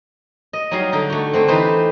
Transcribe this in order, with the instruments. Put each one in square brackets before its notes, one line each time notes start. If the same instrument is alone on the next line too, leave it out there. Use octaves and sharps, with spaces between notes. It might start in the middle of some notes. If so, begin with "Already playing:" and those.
[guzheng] D#5
F#3 G3 D#4 G#4 F5 A#5
D3 D#4 G5 A#5
A3 F#4
D3 A3 C4
E3 D#4 G4 B4 C5